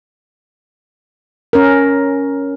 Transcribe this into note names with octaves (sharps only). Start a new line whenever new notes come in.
C#4 A#4